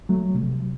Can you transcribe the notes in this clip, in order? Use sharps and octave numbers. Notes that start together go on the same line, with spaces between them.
F#3 A3
C3
F#3